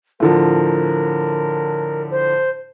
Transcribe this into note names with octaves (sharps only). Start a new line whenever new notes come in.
A2 D3 F3 A#4
C5